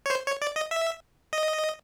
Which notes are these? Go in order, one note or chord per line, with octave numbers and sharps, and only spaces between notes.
C#5
C5
C#5
D5
D#5
E5
D#5